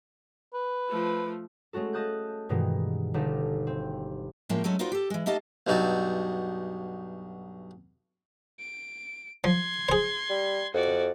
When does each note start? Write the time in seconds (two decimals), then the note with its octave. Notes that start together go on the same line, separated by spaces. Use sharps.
0.54 B4
0.89 F3 A3
1.73 G#3 A3 C#4 F#4 A4
1.93 D#5 F5 A5 D#6 F#6 G6
2.49 G2 B2 D#3 E3 G#3
3.14 G1 D#4 G4 A4 F5
3.67 C4
4.49 A2 F3 G#3 A#3 C#4
4.64 F#3 G#3 A3 C#4
4.79 D#4 F4 F#4 B4 C5 D5
4.92 G4 A4
5.10 E3 G#3
5.26 A3 D#4 G4 D#5 F5 A5
5.67 B1 G2 D#4 F#4 A5
8.59 D7
9.44 F3 C6 G#6
9.89 G#4 C5
10.30 G3
10.74 F2 F#4 D5